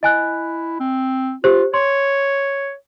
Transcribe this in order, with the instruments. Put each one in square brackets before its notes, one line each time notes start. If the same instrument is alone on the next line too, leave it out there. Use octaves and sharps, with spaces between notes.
[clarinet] E4 [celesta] D#5 G#5 F#6
[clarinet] C4
[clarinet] F4 [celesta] G4 C5
[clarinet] C#5 [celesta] C6